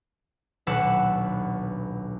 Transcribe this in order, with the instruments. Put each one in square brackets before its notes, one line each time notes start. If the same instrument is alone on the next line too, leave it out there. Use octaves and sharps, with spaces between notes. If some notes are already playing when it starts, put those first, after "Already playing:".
[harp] D#1 B1 D4 B4 F#5 E6